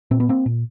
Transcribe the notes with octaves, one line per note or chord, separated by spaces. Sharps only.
A#2 C4
B3
A#3 C4
A#2